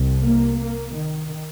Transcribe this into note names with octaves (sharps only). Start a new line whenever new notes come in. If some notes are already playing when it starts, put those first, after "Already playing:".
Already playing: C2 C3
A#3
A#3
D#3